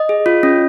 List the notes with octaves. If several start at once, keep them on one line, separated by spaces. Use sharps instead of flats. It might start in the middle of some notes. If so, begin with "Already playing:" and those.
Already playing: D#5
G#4
F4
C#4